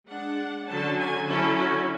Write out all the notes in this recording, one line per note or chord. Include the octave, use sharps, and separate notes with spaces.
G#3 D4 F#5
D3 F#3 C#4 A5
G#5
D3 F#3 C#4 E4 A4
F#4